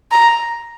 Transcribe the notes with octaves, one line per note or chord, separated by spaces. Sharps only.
A#5